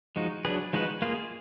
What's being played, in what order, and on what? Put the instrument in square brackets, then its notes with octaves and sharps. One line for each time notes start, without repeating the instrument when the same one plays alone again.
[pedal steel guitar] F3 G#3 D#4 F#4
F#3 D4 G#4 B4
F3 G#3 D#4 F#4 B4
A#3 F4 G#4